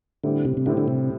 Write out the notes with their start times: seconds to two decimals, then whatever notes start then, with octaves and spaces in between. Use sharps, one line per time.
0.24 A2 D3 G3 C4 E4 G4
0.45 C3
0.57 C3
0.66 A2 D3 G3 C4 E4 G4
0.77 D3
0.88 C3